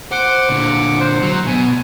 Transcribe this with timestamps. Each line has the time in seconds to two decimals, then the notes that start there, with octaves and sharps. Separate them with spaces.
0.12 C5 F#5 D6
0.50 A#2 D3
1.00 C5
1.22 F#3
1.47 B2 G#5